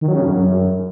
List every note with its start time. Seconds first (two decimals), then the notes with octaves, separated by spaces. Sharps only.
0.01 D#3
0.08 F#3
0.15 C#3
0.21 G2
0.28 F#2